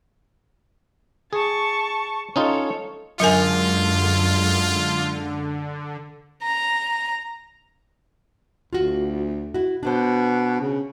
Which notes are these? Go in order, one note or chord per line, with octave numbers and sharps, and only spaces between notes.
G#4 A5 C#6
C#4 D#4 F4 A4 C#5
F#2 D3 F#3 G#3 F4 A#4 G#5
A#5
D2 F4 F#4
E4 F#4
B2 D4 B4 C5
C#3